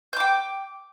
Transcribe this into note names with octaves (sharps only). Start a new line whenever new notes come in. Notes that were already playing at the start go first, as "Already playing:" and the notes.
G5 D6 G6